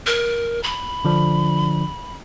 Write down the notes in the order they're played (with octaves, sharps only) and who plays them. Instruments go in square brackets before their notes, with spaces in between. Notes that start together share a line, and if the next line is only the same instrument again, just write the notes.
[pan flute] A#4
B5
[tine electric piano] D3 F3 D4